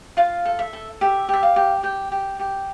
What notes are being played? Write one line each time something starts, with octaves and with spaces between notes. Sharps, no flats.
F4 F5
A4
E5
A4
G4 E5
G4 E5
F5
G4
G4 G5
G4
G4